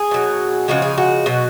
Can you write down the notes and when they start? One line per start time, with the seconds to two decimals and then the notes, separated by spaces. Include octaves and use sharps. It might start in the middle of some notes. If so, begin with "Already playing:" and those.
Already playing: G#4
0.11 B2 F#3
0.68 C#3 F3 G#3 F#4
0.82 G#4
0.98 F#4
1.26 B2 F#3